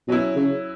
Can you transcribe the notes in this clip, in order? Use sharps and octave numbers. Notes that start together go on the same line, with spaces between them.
B2 F#3 C#4 E4
C#3